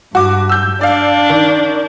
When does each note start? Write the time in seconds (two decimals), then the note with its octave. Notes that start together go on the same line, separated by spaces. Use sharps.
0.15 G2 F#4 D6
0.49 E6 G6
0.81 D4 D5 F5
1.30 D#3